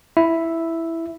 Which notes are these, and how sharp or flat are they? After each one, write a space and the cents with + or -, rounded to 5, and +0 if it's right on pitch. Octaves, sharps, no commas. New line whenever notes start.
E4 +0 E5 +0